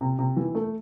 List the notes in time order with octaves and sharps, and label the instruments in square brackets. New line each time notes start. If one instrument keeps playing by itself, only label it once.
[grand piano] C3
C3
E3
A3